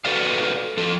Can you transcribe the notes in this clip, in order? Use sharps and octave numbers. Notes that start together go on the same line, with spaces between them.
F#4 A4 B4 D5 E5 F5
F3 A4